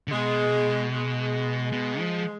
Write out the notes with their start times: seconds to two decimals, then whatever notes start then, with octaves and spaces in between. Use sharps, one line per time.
0.08 D3
0.12 B2 G#3
0.92 G#3
1.72 B2
2.00 F3